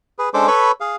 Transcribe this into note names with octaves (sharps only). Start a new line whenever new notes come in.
G#4 B4
G#3 C#4 D4 A4 C5 D6
A4 B4 C#5 B5 C#6
G#4 F5